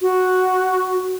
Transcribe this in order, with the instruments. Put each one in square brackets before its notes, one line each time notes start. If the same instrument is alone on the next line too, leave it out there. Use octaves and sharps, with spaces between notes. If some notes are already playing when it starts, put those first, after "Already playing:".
[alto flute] F#4